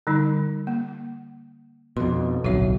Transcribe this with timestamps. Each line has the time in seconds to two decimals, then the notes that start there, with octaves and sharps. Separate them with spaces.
0.07 D3 G3 D#4
0.67 A#3
1.97 F2 B2 C6
2.44 D1 B1 F#4 C#5 E5